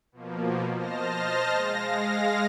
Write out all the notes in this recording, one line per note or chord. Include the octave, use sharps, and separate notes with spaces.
B2 F3 A#3
C5 D#5 A5 F6 A#6
G#3 F5 A#6